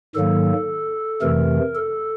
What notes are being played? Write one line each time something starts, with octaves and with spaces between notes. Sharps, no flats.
G#2 D#3 F#3 A#3 A4
F2 C3 E3 A3 A#4
A4